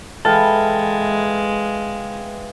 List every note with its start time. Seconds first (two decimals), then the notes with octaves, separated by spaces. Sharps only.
0.25 E3 G#3 A4 F5 G5